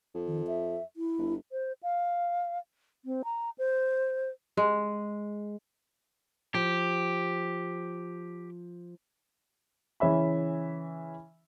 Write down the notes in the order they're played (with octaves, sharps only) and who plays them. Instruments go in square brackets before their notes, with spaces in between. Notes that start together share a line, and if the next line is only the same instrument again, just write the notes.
[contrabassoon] F2
[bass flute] D#3
E5
E4
[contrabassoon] G1
[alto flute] C5
F5
C4
A#5
C5
[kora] G#3
[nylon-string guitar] F3 [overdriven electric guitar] G4
[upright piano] C#3 E3 C#4 E5 B5